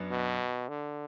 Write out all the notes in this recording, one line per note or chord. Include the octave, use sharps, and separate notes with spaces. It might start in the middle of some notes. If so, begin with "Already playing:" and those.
Already playing: F#2 F#3 B3 D4
B2
D3